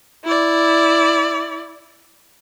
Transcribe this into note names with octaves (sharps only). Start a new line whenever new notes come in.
E4 D5